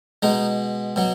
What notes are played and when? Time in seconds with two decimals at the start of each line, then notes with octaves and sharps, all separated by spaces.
0.22 B2 G#3 D#4
0.96 B2 F#3